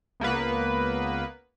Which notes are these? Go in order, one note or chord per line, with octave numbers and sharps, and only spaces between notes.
C#2 A#3 B3 B4